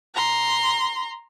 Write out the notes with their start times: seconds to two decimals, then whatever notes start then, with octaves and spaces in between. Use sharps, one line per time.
0.15 A#5 C6